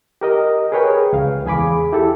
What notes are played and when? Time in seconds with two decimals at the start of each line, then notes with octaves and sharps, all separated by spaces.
0.21 G4 A#4 D#5
0.72 G#4 A#4 B4 C#5 G5
1.13 C#2 F5
1.45 E2 G#4 G#5 B5 D6
1.92 E4 G4 A4